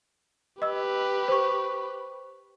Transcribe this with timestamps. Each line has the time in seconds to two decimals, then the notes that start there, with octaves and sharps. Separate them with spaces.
0.62 G4 B4 D#5 E6
1.28 C5 C#6